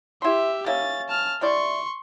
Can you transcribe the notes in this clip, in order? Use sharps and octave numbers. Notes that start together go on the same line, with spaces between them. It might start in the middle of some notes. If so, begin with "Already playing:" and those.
E4 G4 E5 C6
A#3 C#4 E5 A6
A5 F6
G3 E4 D5 C6 C#6